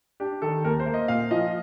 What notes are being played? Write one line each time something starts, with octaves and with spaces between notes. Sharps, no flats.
D4 G4
D#3 A4
D#2 A#4
C5
A#3
D#5
A#2 F5
F3 D#5